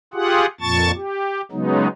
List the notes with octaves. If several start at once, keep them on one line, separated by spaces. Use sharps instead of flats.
F4 G4 G#4 F#5
F2 A#2 A5 C#6 A6
G4
C#3 F#3 G#3 B3 D#4